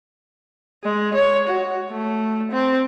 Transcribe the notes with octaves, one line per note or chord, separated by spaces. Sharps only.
G#3
C#5
F#4
A3
C4